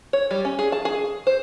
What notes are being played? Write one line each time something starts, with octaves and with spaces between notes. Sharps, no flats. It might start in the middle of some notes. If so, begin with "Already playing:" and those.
C#5
G3
C#4
G#4
A5
G#4
C5